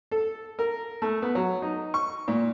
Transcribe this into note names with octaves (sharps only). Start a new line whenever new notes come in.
A4
A#4
A3
B3
F#3
D#4
C#6
A#2